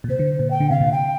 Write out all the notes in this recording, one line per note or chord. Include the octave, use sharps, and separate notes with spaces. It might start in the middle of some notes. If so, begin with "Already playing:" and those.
A#2
C3 C5
D3
A#2
G5
D3
C3 F5
A#2
G5